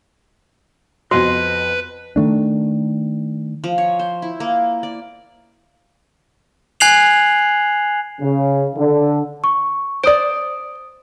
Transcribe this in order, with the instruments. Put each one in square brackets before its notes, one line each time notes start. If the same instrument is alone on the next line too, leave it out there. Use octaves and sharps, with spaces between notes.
[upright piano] F2 C4 [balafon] B3 F#4 [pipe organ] B4 [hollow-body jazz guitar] D#5 C6
[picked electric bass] D#3 A3 D4
[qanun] F3
C#5
C5
E4
A#3
D5
[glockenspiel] G#5 F#6 G#6 C7 F7 F#7
[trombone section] C#3
D3
[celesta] C#6
[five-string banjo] C5 D5 [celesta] D#6 D7